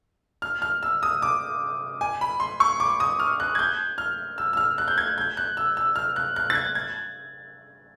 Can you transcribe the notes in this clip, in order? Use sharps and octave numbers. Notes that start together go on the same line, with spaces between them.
F6
F6
E6
D#6
D6
G#5
B5
C6
C#6
D6
D#6
F6
F#6
G#6
G6
F6
E6
E6
F6
F#6
G6
G#6
G6
F#6
E6
E6
F6
F#6
F#6
A6
G#6
G#6